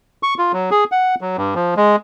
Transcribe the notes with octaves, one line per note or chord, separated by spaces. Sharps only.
C#6
F4
F#3
G#4
F#5
F#3
G2
F3
G#3